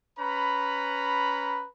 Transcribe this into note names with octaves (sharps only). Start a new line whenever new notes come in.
C#4 B4 A#5 B5